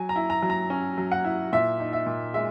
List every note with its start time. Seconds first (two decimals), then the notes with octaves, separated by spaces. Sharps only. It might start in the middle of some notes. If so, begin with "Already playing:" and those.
Already playing: F#3 G#5
0.09 A#5
0.16 E4
0.30 A#5
0.42 F#3
0.50 A#5
0.70 C#4
0.98 F#3
1.12 F#5
1.25 E4
1.52 A#2 E5
1.80 D#4
1.93 E5
2.06 A#2
2.34 G#3 E5